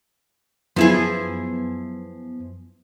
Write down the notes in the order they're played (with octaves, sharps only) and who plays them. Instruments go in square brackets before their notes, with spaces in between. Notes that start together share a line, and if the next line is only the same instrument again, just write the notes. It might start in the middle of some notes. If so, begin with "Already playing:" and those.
[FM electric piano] F#2 B3 [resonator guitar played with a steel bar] F3 E4 G#4